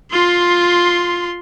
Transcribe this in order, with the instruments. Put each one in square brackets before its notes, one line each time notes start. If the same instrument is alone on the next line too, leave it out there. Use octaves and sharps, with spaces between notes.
[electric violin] F4 C6